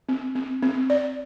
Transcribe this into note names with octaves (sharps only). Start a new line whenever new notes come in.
C4
C4
C4
D5